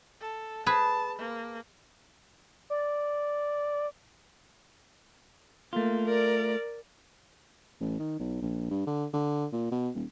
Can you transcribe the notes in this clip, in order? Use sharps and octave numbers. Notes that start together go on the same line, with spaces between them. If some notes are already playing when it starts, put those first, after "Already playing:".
A4
G#4 B4 A5
A#3
D5
A3 A#3 F4
A#4 D5
A1
D#3
B1
A#1
G2
D3
D3
A#2
B2
D#1